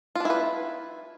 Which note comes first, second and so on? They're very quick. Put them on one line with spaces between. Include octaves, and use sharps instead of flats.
F4 D4 E4 B4